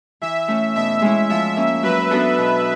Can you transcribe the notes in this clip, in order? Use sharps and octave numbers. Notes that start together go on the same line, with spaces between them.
E3 E5
A3 C#4
B2 E5
G#3 C#4 E4
F3 E5
A#3 C#4
F#3 B4
B3 D4 F#4 A4
B2